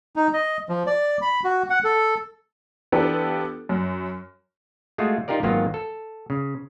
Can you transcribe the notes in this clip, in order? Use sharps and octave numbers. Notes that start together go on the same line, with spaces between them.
D#4
D#5
F3
D5
B5
F#4
F#5
A4
E3 B3 D4 F4 G4 A4
F#2
G#3 A3 F4 F#4 G#4
D#4 F4 G4 A#4 D5
G#1 D#3 F#3 A#3 B3 F4
A4
C#3